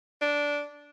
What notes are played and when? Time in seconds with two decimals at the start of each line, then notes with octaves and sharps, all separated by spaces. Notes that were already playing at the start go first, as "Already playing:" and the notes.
0.21 D4